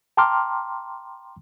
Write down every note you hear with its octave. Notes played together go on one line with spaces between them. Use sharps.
G5 A5 A#5 C6 D6 F6